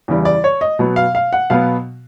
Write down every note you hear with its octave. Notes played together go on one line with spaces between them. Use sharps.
E2 C#3 E3 G3
D5
C#5
D#5
B2 F#3 B3
F5
F5
F#5
B2 F#3 B3 F5